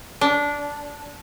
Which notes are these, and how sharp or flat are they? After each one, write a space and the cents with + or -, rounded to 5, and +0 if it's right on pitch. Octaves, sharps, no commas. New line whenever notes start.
D4 -15